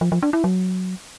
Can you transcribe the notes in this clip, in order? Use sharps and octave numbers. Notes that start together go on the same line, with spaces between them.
F3
F3
D4
E4
F#3